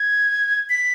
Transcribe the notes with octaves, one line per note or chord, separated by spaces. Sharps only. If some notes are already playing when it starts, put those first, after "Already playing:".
Already playing: G#6
B6